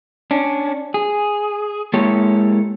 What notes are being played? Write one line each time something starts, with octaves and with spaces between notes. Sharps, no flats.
C#4 D4
G#4
G#3 A#3 E4 G4 A4 C#5